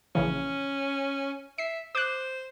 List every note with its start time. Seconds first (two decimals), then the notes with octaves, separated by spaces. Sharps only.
0.15 A#1 C#3 E3 C#4
1.58 E5 C7
1.95 C5 D6 F#6